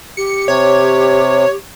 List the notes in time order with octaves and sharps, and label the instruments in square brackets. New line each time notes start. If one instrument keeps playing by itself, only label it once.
[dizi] G4 [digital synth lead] C#7
[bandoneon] C3 [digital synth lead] C#5